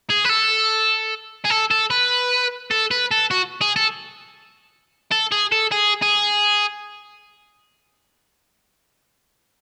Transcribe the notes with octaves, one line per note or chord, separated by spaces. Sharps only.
G#4
B4
A4
G#4
A4
A4
B4
A4
B4
A4
F#4
G#4
A4
A4
G#4
A4
G#4
G#4